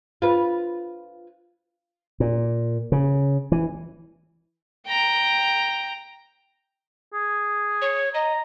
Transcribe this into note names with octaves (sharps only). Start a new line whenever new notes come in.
F4 B4
A#2
C#3
E3
G5 A#5
G#4
C#5
D#5 A#5